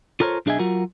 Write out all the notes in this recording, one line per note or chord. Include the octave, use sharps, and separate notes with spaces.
F4 A4 A#4 C5 C#5
B1 D4 G#4 D#5 E5 G#5
F#3 F4 F#4 A#4